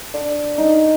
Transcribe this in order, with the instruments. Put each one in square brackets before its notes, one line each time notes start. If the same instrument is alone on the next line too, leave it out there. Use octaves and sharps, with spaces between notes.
[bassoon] D4
[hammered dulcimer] D#4